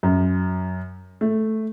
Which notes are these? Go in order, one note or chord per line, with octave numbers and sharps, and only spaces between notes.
F#2
A3